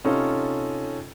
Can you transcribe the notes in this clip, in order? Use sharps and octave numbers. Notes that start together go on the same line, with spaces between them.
C3 C#4 D#4 F4 A4